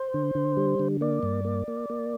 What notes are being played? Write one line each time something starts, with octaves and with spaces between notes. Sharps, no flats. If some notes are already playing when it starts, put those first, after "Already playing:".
Already playing: C5
D3
D3
G3
D3
A#3 D5
G2
A#3
A#3
A#3